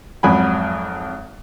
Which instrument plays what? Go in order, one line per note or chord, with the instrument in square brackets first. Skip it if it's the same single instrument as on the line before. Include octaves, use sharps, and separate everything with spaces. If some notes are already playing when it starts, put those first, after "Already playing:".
[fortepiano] G#1 F2 F#3 G#5 B5